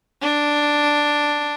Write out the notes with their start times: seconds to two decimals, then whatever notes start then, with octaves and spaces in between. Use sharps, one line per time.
0.21 D4